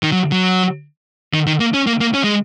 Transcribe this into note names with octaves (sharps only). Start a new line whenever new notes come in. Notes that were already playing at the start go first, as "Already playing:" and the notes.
D#3
F#3
F#3
D#3
D#3
A#3
C#4
A#3
A#3
C#4
G#3